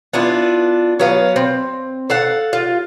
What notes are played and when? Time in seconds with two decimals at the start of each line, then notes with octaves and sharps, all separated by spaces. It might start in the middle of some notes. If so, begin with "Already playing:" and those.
0.13 B3 D4 E4 F4
0.99 F#3 B3 F5
1.36 C4
2.10 A4 F5 F#5
2.53 F4